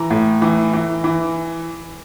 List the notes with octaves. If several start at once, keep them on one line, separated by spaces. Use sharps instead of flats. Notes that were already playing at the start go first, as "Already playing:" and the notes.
Already playing: E3 A#5
A2
E3
E3
E3